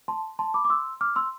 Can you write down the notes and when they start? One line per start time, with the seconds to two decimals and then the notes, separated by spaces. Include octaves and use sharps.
0.08 A5 C6
0.39 A5 C6
0.54 B5 D6
0.65 D6
0.70 C6 E6
1.01 D6 F6
1.16 C6 E6